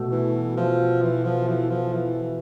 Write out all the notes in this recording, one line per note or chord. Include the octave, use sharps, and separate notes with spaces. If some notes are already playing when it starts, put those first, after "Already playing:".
Already playing: B2 A3
E3
F3
E3
F3
E3
F3
E3